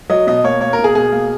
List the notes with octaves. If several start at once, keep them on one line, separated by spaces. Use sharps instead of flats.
F#3 D#5
B2 D#5
A#3 C#5
A#3 C#5
A#4
B2
G#4
B2 G#4
A#3